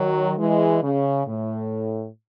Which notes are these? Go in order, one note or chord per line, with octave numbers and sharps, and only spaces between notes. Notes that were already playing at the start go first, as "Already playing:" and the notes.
Already playing: D#3 F#3
E3 G#3
C#3
A2